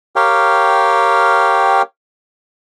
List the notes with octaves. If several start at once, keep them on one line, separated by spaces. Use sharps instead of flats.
G4 A#4 C#5 F5 G5